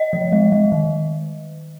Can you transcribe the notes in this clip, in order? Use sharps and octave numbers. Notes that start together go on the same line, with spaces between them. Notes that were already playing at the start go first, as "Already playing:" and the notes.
Already playing: D#5
F3
G#3
G#3
D#3